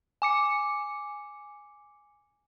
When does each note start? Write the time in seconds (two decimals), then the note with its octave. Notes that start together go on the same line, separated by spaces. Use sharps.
0.22 G#5 D6 C#7